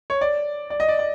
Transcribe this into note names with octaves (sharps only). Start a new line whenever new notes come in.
C#5
D5
D5
D#5
D5
D5